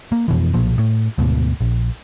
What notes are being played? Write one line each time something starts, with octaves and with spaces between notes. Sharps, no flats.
A#3
F2 B2 E3
B1 A#2 F3
A2
D2 G#2 B2
A#1